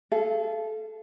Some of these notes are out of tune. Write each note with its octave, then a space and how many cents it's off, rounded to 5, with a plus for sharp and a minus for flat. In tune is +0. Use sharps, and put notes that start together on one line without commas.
A4 -20 F5 -40